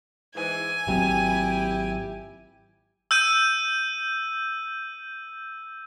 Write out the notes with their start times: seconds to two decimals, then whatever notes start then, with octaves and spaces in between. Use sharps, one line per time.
0.35 G#2 E3 G#5
0.87 G#1 F#3 C4 E4 G4
3.11 E6 G6 D#7